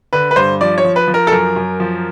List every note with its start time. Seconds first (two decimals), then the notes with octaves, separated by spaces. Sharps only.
0.13 D3 B4
0.31 B4
0.36 G2 C5
0.61 F3 D5
0.78 C#5
0.84 F3
0.96 B4
1.08 F3
1.14 A#4
1.27 A4
1.31 F#2 A#4
1.56 F#2
1.80 F3